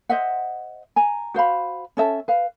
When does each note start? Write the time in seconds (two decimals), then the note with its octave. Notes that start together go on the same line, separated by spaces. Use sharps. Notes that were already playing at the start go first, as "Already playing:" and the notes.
0.09 C5 D#5 E5 F#5
0.96 G#5 A#5
1.34 F#4 C5 F5 B5
1.97 C#4 A4 E5 A5
2.28 B4 F5